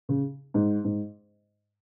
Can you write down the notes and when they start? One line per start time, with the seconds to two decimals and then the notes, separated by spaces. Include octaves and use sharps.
0.09 C#3
0.54 G#2
0.84 G#2